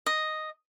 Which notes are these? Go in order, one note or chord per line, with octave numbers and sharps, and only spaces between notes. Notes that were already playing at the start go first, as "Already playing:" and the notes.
D#5